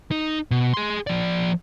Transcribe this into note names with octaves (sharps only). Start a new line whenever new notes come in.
D#4
B2
G#4 C6
F3 D5